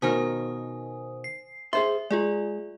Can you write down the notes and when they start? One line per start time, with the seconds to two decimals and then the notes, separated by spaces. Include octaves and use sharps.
0.02 B2 D#3 A#4 C5 G#5 D#6
1.24 C7
1.73 G#4 C5 E5 C6
2.11 G#3 F4 G#4 D5